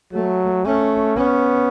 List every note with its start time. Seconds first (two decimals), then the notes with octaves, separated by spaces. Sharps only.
0.13 F#3 A3
0.65 A3 C#4
1.17 B3 C#4